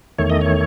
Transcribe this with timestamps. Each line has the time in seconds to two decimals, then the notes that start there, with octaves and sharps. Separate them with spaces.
0.18 E2 D#3 A3 C#5
0.30 D#5
0.41 C#5